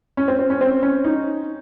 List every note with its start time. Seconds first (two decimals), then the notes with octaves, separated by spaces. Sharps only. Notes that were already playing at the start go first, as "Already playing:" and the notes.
0.17 C#4
0.28 C4
0.39 C4
0.50 C#4
0.61 C4
0.83 C#4
1.05 D#4